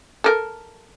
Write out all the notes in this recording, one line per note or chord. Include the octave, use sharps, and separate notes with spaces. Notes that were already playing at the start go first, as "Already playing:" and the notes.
A4 A#4